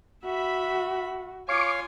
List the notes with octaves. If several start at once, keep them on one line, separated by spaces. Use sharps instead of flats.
F#4 E5 B5
F4 C#5 F5 G#5 C#6 D6